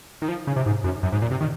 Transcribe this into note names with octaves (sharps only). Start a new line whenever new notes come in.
D#3
F3
C#3
C3
G#2
F#2
F#2
G#2
A#2
C3
D#3